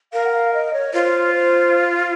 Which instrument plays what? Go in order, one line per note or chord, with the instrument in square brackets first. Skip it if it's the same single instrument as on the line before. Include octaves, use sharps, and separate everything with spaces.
[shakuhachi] A#4 [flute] F5
[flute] F#5
F5
D#5
C#5
[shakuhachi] F4 [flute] C5
[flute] C5